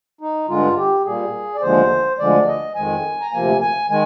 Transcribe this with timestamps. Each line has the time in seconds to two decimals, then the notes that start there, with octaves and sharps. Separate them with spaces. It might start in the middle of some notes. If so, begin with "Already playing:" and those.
0.21 D#4
0.49 G2 D3 G#3 F4
0.77 G4
1.05 A#2 G3 A#3 G#4
1.55 D5
1.62 D#2 D3 F3 G#3 C5
2.19 D2 D3 F3 G#3 D5
2.47 D#5
2.75 F2 D#3 G#3 G#5
3.21 A#5
3.32 D2 C3 F3 A#3 G#5
3.61 G#5
3.89 D#3 G#3 G#5